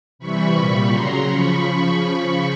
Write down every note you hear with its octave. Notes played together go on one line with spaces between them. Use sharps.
C3 E3 G3 B5 C#6
A#2 G3 B5 C#6
C#3 F#3 A#5 C6
C#3 F3 B5 C#6